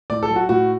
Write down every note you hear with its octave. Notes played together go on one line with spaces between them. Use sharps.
A2 D5
A4
F#3
F#4
A2 F#4